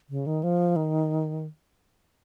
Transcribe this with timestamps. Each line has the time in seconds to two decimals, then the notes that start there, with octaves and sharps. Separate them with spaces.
0.10 C#3
0.26 D#3
0.43 F3
0.76 D#3